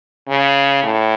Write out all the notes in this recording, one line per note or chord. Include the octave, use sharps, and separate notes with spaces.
C#3
A2